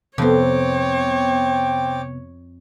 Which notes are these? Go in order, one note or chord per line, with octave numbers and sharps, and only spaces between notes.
F2 C3 B3 C4 C5 C#5 G5 D6